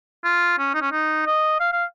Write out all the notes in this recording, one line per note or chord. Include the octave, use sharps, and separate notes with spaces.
F4
C#4
D#4
C#4
D#4
D#5
F5
F5